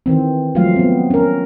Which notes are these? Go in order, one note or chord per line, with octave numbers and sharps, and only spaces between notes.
D#3 E3 C4
F3 F#3 G#3 A3 F4 F5
B3 C4
C#4 A#4